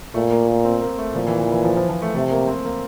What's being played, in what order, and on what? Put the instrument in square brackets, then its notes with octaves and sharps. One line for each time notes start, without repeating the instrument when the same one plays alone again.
[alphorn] A#2 [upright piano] A3
[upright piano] A#3
A#3
C4
A#3
A3
[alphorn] A#2 [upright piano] F3
[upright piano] E3
E3
E3
F3
F3
F3
A3
[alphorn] C3 [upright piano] A3
[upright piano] A#3
C4
A#3